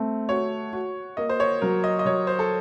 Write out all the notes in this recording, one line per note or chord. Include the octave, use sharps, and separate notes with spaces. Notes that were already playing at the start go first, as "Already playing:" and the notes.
Already playing: A3 C4
F#4 C#5
F#4
A#3 D#5
C5
C#5
F#3 A#4
D#5
D#5
F#3 C#5
C5
A4